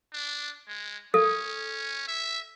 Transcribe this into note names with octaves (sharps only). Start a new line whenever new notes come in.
D4
G#3
C#4 A4
E5